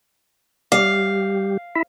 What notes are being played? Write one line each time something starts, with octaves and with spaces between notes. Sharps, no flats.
G3 G4 F5
E4 E5